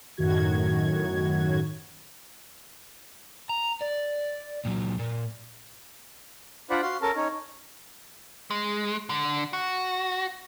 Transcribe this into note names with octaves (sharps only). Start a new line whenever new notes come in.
F#2 A2 D#3 F#4 G#6
A#5
D5
A#2 F#3
A#2
D4 F4 C5 D5 F#5 B5
F#4 F5 C6
C#4 A4 A#4 A5
C#4 D#4 C#5
G#3
D3
F#4